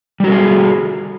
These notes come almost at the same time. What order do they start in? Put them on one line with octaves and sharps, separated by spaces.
G3 F#4 A4 G#4